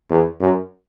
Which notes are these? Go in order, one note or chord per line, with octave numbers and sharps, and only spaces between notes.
E2
F#2